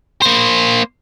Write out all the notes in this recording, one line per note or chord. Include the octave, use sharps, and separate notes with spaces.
A#3 C5